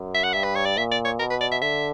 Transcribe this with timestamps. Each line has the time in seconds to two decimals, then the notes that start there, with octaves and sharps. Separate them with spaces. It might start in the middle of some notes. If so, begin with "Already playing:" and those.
Already playing: F#2
0.15 E5
0.23 F#5
0.33 G2 E5
0.44 B4
0.56 C#5
0.66 D5
0.77 A#2 E5
0.92 D5
1.05 C#5
1.19 B2 A#4
1.30 B4
1.41 D5
1.52 E5
1.62 D3 E5